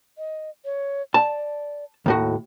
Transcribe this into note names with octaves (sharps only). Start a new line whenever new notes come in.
D#5
C#5
D5 A5
D#2 A2 F#4 A4